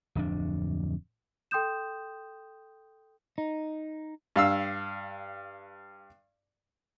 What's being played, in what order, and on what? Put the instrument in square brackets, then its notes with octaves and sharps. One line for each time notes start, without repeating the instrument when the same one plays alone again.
[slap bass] D1 F2 D4
[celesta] A4 G5 C6 D#6 G6 E7
[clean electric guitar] D#4
[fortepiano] G2 F5 E6